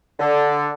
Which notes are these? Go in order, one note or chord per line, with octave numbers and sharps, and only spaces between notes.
D3